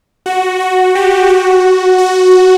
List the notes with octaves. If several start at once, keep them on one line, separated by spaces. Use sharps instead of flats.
F#4
F#4
G4
F#4
F#4